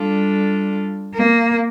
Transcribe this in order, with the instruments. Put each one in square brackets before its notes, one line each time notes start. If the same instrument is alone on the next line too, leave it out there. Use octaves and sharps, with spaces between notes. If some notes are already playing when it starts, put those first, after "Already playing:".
Already playing: [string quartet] G3 D4 F4 A4
[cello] A#3